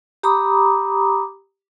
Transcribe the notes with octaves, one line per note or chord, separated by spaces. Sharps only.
G4 A#5 B5 D6 D#6